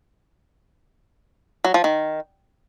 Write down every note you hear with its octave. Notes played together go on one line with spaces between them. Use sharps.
F#3
F3
D#3